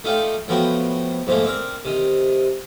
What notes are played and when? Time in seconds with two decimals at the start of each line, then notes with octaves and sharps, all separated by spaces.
0.04 A3 D#4 F4 D5 G5
0.48 A2 F3 B3 F#4 G5
1.27 G#2 F3 A3 A#3
1.44 C4 D4 A#4
1.85 C3 D#3